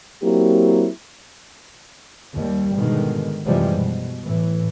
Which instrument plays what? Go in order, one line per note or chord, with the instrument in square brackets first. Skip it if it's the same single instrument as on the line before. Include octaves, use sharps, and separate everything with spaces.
[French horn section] F#3 A#3 C4 E4 G4
[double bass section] D#2 G3
G#2 B2 D3 D#3 G#3
F#2 C3 E3 F3 G3 G#3
B2
A2 E3